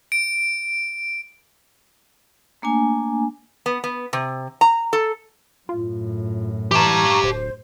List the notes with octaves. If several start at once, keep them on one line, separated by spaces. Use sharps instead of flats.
D7
A3 A#3 D4 G#5
B3
B3
C3
A#5
A4
F#2 A2 F4
E3 G4 A5 A#5 C#6
D1 C5